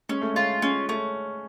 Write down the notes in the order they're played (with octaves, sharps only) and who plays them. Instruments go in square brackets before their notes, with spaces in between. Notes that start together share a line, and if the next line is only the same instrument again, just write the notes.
[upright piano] G#3 [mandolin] C#4
[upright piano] A3
[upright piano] G#3 [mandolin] F4
[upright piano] G#3 [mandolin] C#4
[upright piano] A3 [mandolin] C#4